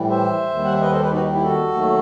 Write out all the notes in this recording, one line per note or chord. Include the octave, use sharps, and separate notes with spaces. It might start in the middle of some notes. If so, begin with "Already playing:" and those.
Already playing: A2 E3 G3
C5 E5
D#2 D#3 G3
F#5
E5
B4 D#5
A4 C5
G4 B4
D#4 F#4
E4 G4
F#4 A4
D#2 D#3 F#3 A3